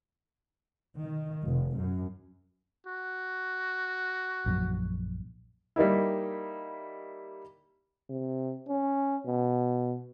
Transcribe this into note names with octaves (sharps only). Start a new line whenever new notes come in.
D#3
F1
F#2
F#4
A#1 F#2
G3 A#3 D#4 E4
C3
C#4
B2